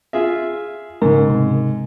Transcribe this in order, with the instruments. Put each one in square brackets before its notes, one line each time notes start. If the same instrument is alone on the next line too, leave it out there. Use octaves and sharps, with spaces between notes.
[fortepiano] F4 G#4 E5
[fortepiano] G#2 [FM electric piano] C#3 A#4
[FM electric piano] C3